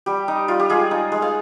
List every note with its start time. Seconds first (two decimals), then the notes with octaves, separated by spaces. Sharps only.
0.06 G3 G4
0.28 D#4
0.48 G3 F4
0.60 G4
0.69 G#3 F4 G#4
0.91 D#4
1.12 G#3
1.22 F5